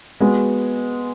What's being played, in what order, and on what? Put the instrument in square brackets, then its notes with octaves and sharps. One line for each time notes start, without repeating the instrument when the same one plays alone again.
[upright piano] G#3 B3 F#4